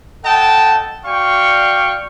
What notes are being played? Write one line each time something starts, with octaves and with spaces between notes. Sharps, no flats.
A4 D#5 F#5 G5 A5
F#4 D5 F5 G5 C#6